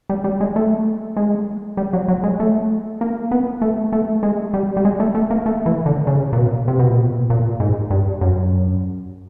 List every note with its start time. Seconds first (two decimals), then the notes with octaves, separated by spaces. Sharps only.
0.09 G3
0.24 G3
0.41 G#3
0.56 A3
1.17 G#3
1.77 G3
1.93 F#3
2.08 F#3
2.24 G#3
2.40 A3
3.01 A#3
3.31 B3
3.62 A3
3.92 A3
4.23 G#3
4.54 G3
4.77 G3
4.85 G#3
5.00 A3
5.15 A3
5.30 A#3
5.46 A3
5.66 E3
5.86 D3
6.07 C#3
6.33 A#2
6.38 B2
6.68 C3
6.79 B2
6.90 A#2
7.02 B2
7.30 A#2
7.60 G#2
7.90 G2
8.21 F#2